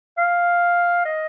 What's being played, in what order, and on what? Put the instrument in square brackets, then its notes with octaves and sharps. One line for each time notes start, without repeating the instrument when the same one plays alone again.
[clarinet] F5
D#5